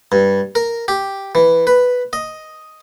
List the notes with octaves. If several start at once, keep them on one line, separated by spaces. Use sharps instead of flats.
G2
A#4
G4
E3
B4
D#5